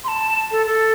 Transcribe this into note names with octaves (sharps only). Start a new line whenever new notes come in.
C6
A5
A4
A4